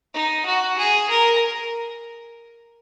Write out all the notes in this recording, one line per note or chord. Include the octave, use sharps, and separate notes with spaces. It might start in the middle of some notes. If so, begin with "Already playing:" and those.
D#4
F#4
G#4
A#4